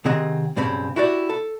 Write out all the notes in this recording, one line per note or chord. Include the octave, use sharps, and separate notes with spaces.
C3 D#3 C4 G#4 D#5 F#5
B1 G2 C#3 C4 B5
E4 F#4 G4 D5
A4